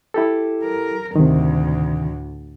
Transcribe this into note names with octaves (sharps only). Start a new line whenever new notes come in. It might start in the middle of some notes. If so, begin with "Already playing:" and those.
E4 G4 A4
A#4
D2 A2 C3 D#3